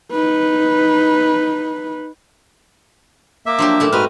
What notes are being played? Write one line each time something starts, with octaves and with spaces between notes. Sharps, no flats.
D#4 B4
A#3 E5 D6
F3 F#3 D4 G4
A#2 A3 E4
G#2 C4 F#4 B4 D#5 F6